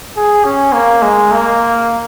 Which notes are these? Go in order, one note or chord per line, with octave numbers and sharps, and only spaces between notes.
G#4
C#4
A#3
G#3
A#3